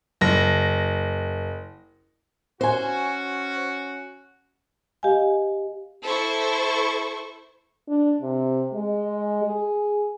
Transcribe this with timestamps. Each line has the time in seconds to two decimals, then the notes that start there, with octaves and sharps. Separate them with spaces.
0.21 F#1 A#6
2.61 C#4 F#4 C5 G#5
5.03 G4 D#5 F5 G#5
6.04 E4 A4 C5 C#6
7.89 D4
8.22 C3
8.73 G#3
9.44 G#4